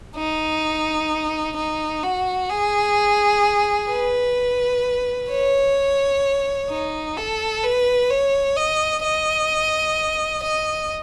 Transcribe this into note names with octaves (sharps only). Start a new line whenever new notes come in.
D#4
D#4
F#4
G#4
B4
C#5
D#4
A4
B4
C#5
D#5
D#5
D#5